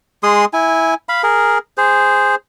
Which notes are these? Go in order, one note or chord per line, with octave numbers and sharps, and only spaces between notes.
G#3 G#4 C6 D#6
E4 G#5
F5 B5
G#4 A#4
G#4 C5